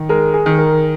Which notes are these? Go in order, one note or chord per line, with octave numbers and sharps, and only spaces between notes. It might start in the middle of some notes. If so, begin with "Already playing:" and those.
Already playing: D#3
G#3 A#4
G#4
D#3
A#4